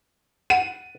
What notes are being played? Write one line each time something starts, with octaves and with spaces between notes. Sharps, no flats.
F#5 D#7